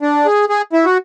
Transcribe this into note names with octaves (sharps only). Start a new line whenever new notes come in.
D4
G#4
G#4
E4
F#4